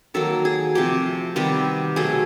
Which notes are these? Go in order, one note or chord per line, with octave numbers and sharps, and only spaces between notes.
D#3 F#3 A#3 A4
G#4
C3 F3 A3 G4
C3 D#3 G3 B3 G4
B2 F#3 A3 G#4